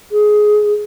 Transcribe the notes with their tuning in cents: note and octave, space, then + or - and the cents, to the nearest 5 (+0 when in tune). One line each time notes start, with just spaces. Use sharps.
G#4 +15